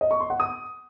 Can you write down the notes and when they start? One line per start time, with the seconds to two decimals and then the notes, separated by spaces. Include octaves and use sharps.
0.01 D#5
0.11 C#6
0.20 C6
0.30 F#5
0.40 D#6